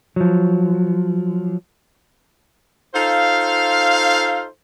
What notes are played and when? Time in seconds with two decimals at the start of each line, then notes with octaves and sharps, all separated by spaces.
0.16 F3 F#3
2.94 D#4 F4 A4 C5 F5